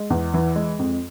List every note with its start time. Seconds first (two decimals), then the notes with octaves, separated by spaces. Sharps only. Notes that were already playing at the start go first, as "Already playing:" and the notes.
Already playing: G#3
0.10 E2
0.34 E3
0.56 G#3
0.79 F2